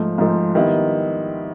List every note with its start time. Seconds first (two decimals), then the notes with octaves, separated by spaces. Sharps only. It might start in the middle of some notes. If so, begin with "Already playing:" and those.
Already playing: G#2 F3 A3
0.18 G#2 F3 A3
0.55 D#3 G3 B3 E4